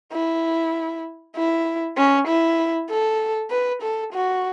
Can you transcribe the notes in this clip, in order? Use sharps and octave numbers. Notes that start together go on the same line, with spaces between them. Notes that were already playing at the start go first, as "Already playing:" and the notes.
E4
E4
C#4
E4
A4
B4
A4
F#4